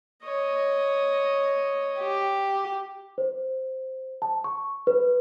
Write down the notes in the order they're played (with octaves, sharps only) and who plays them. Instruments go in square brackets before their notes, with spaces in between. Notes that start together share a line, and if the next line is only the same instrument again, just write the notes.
[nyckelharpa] C#5 D#5
[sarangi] G4
[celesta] C5
A5
C#6
B4